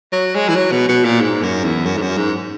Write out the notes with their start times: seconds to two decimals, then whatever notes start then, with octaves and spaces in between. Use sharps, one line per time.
0.12 F#3
0.35 G#3
0.49 E3
0.55 F#3
0.72 B2
0.88 B2
1.05 A#2
1.20 G#2
1.42 F#2
1.64 E2
1.85 F#2
1.97 G#2
2.02 F#2
2.17 G#2